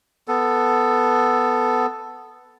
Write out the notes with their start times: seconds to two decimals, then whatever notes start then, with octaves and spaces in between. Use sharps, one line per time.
0.28 B3 A4